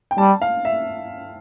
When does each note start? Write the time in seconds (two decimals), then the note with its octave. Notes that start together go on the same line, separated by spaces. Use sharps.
0.11 G5
0.18 G3 A5
0.42 F5
0.65 E5